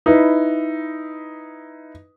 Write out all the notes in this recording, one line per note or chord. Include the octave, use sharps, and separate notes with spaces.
D#4 E4 B4